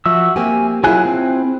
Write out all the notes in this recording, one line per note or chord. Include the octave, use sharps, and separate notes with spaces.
F3 F#4 E5 E6
A#3 C4 G4 G#5
F#3 E4 F4 G#4 G#5 F#6
C4